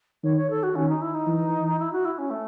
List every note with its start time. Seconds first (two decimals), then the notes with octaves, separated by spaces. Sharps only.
0.24 D#3 C#5
0.37 C#5
0.50 A4
0.63 F#4
0.75 D#3 C#4
0.89 D#4
1.02 E4
1.14 D#4
1.27 E3
1.79 E4
1.92 F#4
2.05 E4
2.18 C#4
2.30 A3